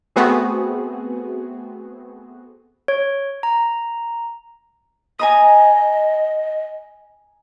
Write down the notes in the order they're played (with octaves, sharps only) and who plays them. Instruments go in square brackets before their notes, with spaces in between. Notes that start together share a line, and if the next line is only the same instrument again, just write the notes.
[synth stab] A3 B3 C4 F#4 G#4
[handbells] C#5
A#5
[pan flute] D#5 [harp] G#5 A#5 D#6